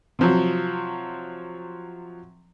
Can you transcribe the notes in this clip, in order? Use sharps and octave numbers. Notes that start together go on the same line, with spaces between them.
C3 F3 F#3